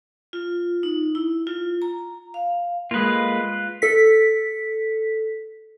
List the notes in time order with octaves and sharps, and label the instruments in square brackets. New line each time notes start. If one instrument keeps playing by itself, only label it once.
[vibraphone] F4
D#4
E4
F4
A#5
F5
[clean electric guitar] G#3 A#3 [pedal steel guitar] F4 B4
[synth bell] A4 B6